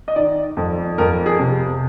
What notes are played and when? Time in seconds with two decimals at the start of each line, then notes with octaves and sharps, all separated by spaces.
0.08 D#5
0.16 D#3 D5
0.57 F2
0.98 F2 A#4
1.26 G#4
1.39 C3